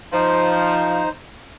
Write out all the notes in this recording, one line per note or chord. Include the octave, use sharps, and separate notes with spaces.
F3 D#4 C5